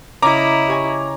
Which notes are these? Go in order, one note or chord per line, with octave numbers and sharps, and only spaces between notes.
C#3 E4 D#5 A#5 D6
G4 C#5 G#5